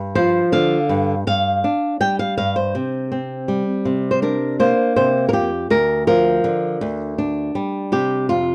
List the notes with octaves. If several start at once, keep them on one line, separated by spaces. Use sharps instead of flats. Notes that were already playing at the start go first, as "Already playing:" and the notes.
Already playing: G2
F3 C5
D3 F5
G2
G2 F5
D4
G3 G5
F5
G2 F5
C5
C3
C4
G3
C3
C5
D4 A#4
A#3 C5
C3 C5
A#4
F2 G4
D2 A#4
F3 A#4
D3
D2
D4
G3
C3 G4
F2 F4